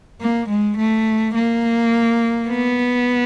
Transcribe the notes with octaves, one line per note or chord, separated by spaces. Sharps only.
A#3
G#3
A3
A#3
B3